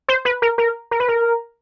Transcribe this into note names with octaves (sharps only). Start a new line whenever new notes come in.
C5
B4
A#4
A#4
A#4
B4
A#4